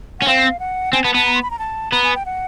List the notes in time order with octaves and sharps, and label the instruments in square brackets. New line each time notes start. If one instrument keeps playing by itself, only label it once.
[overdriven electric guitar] C#4 [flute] F#5
[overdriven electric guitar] C4 [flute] F5
[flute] F#5
[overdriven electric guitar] C4 [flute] G#5
[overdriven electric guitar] B3 [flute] A5
[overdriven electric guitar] B3 [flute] A5
[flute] A#5
C6
B5
A#5
A5
[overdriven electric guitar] B3 [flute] A#5
[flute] G#5
G5
F#5